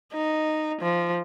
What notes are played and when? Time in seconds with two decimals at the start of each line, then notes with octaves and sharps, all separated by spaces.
0.14 D#4
0.81 F3